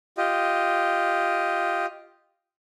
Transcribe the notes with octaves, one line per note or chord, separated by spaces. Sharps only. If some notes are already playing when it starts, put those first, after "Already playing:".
F4 G4 D#5